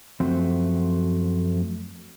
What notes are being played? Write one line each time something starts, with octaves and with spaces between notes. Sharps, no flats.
F#2 F3 A3 C4 F#4 C5